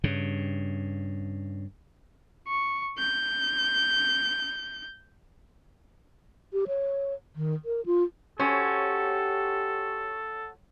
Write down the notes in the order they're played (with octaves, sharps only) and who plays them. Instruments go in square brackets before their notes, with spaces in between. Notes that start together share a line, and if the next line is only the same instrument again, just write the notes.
[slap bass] G2 C#3
[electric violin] C#6
G6
[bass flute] G4
C#5
D#3
A#4
F4
[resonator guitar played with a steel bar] C#4 [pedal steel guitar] F#4 C5 C#5 [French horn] G4 [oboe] A4